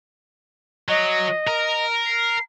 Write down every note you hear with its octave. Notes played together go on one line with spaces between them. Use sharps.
F#3 D#5
A#4
C7